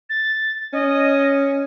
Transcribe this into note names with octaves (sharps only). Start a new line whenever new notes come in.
A6
C#4 D#5